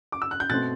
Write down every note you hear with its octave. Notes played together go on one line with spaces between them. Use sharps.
D6
E6
F#6
G6
B2 A3 C4 F#6 A6